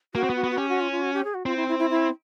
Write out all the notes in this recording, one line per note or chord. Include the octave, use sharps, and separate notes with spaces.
A#3 F#4
C4
B3
F#4
B3
F#4
C#4 G4
F#4
F4
F4
F#4
G4
G#4
F#4
C4 F4
E4
E4
E4
E4